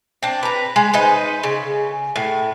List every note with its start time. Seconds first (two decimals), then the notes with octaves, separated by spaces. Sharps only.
0.23 C4 D4
0.43 B4 A#5
0.76 G#3
0.93 D#4 B4 C5
1.43 C#3
2.16 A2